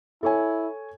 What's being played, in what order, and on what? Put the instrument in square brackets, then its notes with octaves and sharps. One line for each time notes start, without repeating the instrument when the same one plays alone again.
[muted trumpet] E4 [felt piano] A4 C#5 G#5